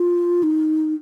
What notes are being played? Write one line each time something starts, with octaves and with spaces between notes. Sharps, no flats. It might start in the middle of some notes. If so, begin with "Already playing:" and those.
Already playing: F4
D#4